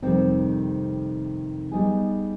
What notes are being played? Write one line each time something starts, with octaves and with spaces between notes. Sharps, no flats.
F2 C3 D#3 G3 C4
G3 B3 D#4 G#4